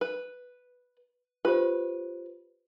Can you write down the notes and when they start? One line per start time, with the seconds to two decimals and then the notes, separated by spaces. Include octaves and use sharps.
0.01 B4
1.45 F4 G4 B4 C5